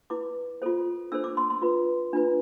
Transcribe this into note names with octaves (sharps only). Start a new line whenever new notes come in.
E4 B4 D6
F4 A4 C5
D4 A4 C5 E6
D6
C6
C6
F4 B4
D4 F4 B4